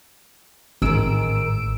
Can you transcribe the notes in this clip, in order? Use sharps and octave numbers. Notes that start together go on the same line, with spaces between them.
A1 G#2 D#3 E6 D7